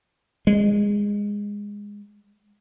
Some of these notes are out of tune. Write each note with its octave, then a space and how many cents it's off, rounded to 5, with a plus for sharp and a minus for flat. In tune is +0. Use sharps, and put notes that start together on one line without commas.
G#3 -15